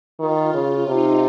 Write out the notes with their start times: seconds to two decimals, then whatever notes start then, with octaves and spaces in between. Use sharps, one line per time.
0.19 D#3 F4
0.54 C#3
0.87 C3 D#4